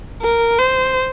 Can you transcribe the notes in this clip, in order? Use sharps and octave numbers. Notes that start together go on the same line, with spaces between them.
A#4
C5